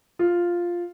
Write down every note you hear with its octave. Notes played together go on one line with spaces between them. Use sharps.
F4